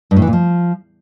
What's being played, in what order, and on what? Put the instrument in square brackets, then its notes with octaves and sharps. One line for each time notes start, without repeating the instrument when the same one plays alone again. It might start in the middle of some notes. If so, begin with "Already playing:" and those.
[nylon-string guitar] G2
A2
E3
A#2
F3